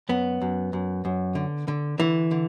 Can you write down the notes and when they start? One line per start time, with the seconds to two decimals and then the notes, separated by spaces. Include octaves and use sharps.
0.09 F#2 B3
0.41 F#2
0.73 F#2
1.05 F#2
1.35 D3
1.68 D3
1.98 D3 E3
2.31 D3